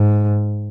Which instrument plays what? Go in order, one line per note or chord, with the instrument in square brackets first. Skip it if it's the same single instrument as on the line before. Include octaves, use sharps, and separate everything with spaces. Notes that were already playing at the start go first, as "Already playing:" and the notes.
Already playing: [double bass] G#2